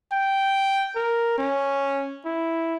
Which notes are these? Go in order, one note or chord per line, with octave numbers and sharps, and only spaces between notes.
G5
A#4
C#4
E4